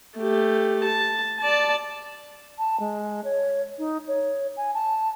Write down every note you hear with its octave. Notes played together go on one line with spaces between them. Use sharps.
A3 G4
A5
D5 A5
A5
G#3
C#5
D#4
C#5
G#5
A5